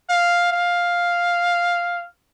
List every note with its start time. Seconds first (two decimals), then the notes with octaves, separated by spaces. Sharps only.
0.10 F5
0.52 F5